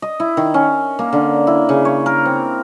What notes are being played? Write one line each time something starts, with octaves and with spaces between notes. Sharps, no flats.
D#5
E4
D#3
C#4
A#3
D3
E4
C#3
C#5
A#4
C4